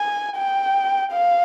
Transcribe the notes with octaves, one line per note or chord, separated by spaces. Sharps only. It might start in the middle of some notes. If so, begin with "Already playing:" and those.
Already playing: G#5
G5
F5